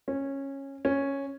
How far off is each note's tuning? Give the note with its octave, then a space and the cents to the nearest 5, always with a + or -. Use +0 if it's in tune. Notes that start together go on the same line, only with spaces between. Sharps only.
C#4 -15
C#4 -5